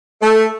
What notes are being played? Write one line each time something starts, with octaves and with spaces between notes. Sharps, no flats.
A3